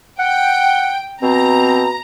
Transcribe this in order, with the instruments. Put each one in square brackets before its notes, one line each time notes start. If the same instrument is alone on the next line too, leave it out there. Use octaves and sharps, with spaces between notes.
[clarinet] F#5 [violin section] G5
[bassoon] B2 [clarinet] C4 [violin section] A#5